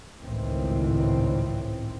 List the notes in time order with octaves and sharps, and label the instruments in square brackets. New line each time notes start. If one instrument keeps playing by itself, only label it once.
[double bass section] G#1 C#2 A2 D#3 E3 C4